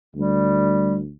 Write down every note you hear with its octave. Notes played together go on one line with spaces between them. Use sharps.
D2 G3